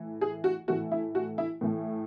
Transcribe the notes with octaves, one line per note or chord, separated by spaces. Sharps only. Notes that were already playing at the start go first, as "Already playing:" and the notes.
Already playing: A2 E3 A3
G#4
F#4
A2 E3 A3 F#4
E4
F#4
E4
A2 E3 A3